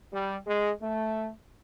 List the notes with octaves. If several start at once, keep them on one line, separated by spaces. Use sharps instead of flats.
G3
G#3
A3